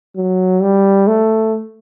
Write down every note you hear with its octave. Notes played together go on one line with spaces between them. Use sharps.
F#3
G3
A3